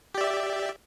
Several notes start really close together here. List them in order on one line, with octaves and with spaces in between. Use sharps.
G4 D5 E5